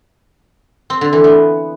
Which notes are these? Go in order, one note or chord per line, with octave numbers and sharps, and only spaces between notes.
C4
D3
E3
B3